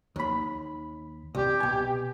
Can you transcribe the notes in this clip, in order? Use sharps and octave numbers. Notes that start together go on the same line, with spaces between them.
D#2 B5
C2 G4
B2 G#5